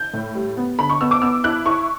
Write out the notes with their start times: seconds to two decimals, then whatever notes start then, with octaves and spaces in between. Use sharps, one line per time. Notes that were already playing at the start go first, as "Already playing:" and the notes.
Already playing: G6
0.13 A2
0.35 G3
0.57 B3
0.79 D3 B5
0.89 C#6
1.01 B3 E6
1.11 D6
1.22 B3 E6
1.44 E4 F#6
1.65 E4 C#6